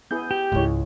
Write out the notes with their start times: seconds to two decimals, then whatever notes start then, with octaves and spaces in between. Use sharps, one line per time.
0.11 B3 E4 G#4 G6
0.31 G4
0.52 C#2 G#2 G#3 E4 C#5